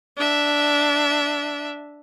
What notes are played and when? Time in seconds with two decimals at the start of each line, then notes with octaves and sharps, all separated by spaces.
0.17 D4 E5